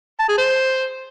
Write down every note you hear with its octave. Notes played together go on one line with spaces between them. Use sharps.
A5
G#4
C5